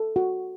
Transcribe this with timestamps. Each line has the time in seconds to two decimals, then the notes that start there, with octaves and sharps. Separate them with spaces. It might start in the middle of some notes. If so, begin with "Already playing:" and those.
Already playing: A4
0.16 F#4